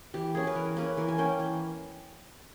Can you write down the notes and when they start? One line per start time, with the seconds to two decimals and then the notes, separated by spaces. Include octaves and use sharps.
0.14 E3 G4
0.34 A#3 C#4 G#4
0.47 B4
0.55 E3 A#4
0.77 A#3 C#4 B4
0.97 E3 A#4
1.08 G#5
1.18 A#3 C#4 G5
1.39 E3